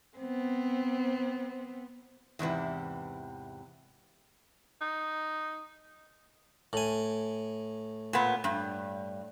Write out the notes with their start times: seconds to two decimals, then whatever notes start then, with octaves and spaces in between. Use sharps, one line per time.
0.18 B3 C4
2.39 E2 G#2 C3 E3
4.81 D#4
6.73 A2 G#5
8.13 A#2 B3
8.44 G2